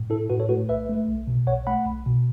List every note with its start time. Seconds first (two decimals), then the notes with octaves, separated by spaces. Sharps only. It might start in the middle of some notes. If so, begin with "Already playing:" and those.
Already playing: A2
0.10 E4 A4
0.30 A2 F#4 B4
0.40 A4 C#5
0.49 A3 F#4 B4
0.69 B1 B4 E5
0.89 A3
1.08 B1
1.27 B2
1.47 B1 C#5 F#5
1.67 A3 F#5 B5
1.86 B1
2.06 B2